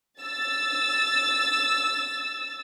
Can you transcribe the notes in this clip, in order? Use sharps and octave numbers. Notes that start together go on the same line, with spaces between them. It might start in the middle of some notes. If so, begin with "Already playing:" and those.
E6 A6